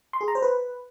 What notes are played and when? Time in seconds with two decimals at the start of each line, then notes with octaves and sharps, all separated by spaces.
0.13 C6
0.21 G#4
0.28 A#5
0.35 C5
0.42 B4